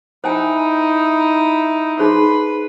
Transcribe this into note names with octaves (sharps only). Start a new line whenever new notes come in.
D#4 E4 C5 G5 G#5
D#4 G#4 B4 C5 C6